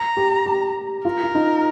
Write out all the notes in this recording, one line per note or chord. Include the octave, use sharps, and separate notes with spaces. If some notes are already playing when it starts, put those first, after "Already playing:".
Already playing: A#5
G4
G4
F4 A#4
F4
D#4